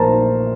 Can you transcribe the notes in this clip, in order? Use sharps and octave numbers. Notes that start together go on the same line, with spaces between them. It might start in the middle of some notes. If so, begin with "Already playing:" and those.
Already playing: A#1 A#2 F3 A#4 C5 A5 A#5